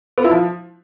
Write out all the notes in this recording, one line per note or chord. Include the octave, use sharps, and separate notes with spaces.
B3
E4
F3